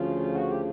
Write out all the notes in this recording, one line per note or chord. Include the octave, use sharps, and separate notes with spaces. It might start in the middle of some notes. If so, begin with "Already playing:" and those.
Already playing: D2 C#3 F3 F4
F#4
G4